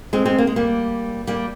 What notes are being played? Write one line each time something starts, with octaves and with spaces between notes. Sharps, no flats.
G#3 C4
G#3 C4
A#3
G#3
G3 A#3
G3 A#3